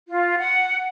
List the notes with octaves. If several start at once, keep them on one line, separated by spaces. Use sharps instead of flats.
F4
F#5